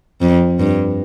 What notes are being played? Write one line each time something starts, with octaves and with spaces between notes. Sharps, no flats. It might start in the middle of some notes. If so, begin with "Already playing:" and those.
F2
G2